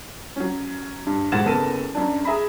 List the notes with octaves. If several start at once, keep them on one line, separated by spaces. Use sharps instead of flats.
F#3 C#4
G2
D#1 G#2 F#5 A6 E7
F#1 B3 A4 A#4 A5 D#7
F#2 D4
G#4 E5 A#5 B5